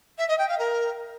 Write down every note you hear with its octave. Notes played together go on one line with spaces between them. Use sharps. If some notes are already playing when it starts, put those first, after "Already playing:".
E5
D#5
G5
F5
A#4